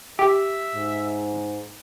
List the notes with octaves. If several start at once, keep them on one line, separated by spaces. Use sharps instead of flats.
G4 E5
G#2